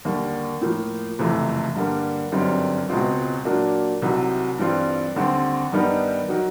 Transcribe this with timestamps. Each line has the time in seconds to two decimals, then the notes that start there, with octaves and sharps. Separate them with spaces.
0.05 D#2 D3 G3 A#3
0.61 A2 F3 A#3
1.19 F#1 F2 C3 E3 A3
1.75 G2 D3 G3 A#3
2.32 G1 F#2 D#3 G3 C4
2.89 C#2 B2 G#3 C4 F4
3.45 A#2 F#3 A#3 D4
4.02 C2 C3 D#3 F#3
4.58 G2 E3 G3 C4 F4
5.16 D#2 D3 G3 C4
5.72 G2 D#3 G3 B3 D#4
6.28 D#3 F#3